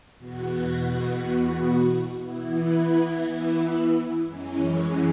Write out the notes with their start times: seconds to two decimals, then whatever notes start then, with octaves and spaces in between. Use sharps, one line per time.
0.17 E2 B2 B3 F#4
2.21 E3 B3 E4
4.23 F#2 E3 G#3 C#4